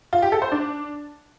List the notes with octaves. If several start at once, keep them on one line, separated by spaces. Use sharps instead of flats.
F4
G4
A4
C5
D4